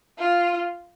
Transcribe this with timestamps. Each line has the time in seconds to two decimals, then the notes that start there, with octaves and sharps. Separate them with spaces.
0.18 F4